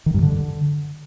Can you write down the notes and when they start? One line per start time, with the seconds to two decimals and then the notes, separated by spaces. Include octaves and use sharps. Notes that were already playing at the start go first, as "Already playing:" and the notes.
0.06 D#3
0.14 G2
0.22 D3